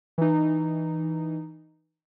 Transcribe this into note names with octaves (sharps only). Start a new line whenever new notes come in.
E3 D#4